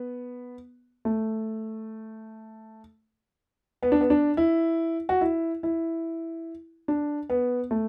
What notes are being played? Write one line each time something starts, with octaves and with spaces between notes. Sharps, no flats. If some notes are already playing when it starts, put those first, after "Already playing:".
Already playing: B3
A3
B3
D4
B3
D4
E4
F#4
E4
E4
D4
B3
A3